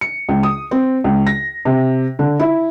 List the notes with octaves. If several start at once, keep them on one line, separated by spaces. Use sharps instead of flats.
C#7
C#2
D#6
C4
C#2
A#6
C3
D3
E4